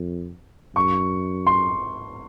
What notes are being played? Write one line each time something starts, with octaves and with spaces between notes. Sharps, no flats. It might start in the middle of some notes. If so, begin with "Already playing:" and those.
Already playing: F2
F#2 C#6
C6